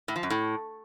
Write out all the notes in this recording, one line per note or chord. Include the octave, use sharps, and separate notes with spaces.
A2
F3
F#2
A2